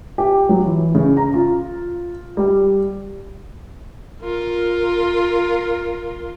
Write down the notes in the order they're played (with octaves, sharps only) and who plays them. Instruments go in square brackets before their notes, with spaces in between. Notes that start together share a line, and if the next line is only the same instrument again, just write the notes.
[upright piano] G4
F#3
E3
C#3
A#5
F4
G3
[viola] F4 A#4